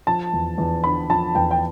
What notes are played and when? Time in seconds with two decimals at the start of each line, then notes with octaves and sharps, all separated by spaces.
0.07 F3 A5
0.33 E2
0.58 E2
0.84 D3 B5
1.10 F3 A5
1.35 E2 G5
1.51 G5